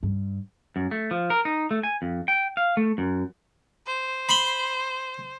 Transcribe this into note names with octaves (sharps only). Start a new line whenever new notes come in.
G2
F#2
A3
F3
A#4
D#4
A3
G#5
F2
G5
F5
A3
F#2
C5
B5 C6